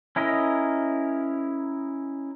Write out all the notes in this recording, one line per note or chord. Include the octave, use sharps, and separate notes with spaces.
C#4 E4 A#4 D#5